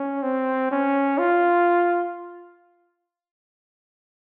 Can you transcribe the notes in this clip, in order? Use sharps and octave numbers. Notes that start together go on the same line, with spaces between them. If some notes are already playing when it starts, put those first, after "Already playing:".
Already playing: C#4
C4
C#4
F4